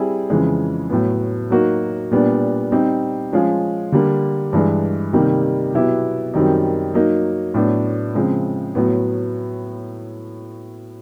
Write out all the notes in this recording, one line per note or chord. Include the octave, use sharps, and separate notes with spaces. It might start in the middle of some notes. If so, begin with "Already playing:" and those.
Already playing: G3 C4 E4 G#4
F2 C#3 E3 G#3
A2 F#3 B3
F#3 A#3 D#4 F#4
A#2 G3 B3 D4
G3 C4 D#4
F3 G#3 C#4 F4 G#4
D3 G3 A#3
G2 E3 G#3
C3 D#3 G3 A#3 D#4
B2 F#3 B3 E4 G4
F#2 D#3 G3 C4 D#4
F#3 A#3 D#4
A2 F#3 B3 D4
C#3 F3 G#3 C4
A2 F#3 B3